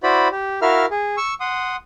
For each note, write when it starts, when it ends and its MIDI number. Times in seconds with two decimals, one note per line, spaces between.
0.03 0.28 64
0.03 0.28 66
0.03 0.28 72
0.03 0.28 74
0.03 0.28 83
0.32 0.60 67
0.62 0.86 64
0.62 0.86 66
0.62 0.86 70
0.62 0.86 76
0.62 0.86 77
0.62 0.86 89
0.91 1.16 68
1.17 1.34 85
1.17 1.34 88
1.40 1.76 78
1.40 1.76 84
1.40 1.76 87